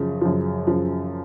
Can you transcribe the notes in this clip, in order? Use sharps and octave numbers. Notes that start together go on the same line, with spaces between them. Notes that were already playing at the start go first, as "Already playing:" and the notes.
Already playing: F#2 C#3 F3
F#2 C#3 F3
F#2 C#3 F3